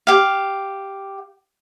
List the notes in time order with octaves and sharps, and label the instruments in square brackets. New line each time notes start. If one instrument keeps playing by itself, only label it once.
[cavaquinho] G4 F5